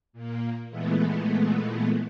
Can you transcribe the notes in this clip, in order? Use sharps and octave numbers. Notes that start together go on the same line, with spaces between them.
A#2 A#3
A#2 E3 G#3 A3 B3